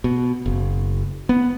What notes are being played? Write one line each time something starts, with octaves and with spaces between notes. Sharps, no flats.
B2
F#1
B3